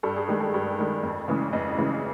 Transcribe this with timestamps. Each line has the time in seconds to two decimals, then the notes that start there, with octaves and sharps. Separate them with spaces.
0.03 G2 A4
0.16 G#4
0.28 D#3 G#3 G4
0.40 A4
0.54 G2
0.79 D#3 G#3
1.03 F2
1.28 C#3 E3 G#3
1.53 F2 D#5
1.77 C#3 E3 G#3